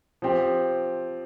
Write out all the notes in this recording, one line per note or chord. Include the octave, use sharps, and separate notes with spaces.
F3 C4 G4